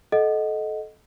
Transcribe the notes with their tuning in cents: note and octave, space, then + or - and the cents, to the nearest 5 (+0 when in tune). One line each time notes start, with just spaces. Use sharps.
A4 -25 D#5 +0 F#5 +0